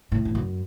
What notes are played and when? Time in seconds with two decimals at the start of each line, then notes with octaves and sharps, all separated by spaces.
0.12 A2
0.25 E2
0.35 F#2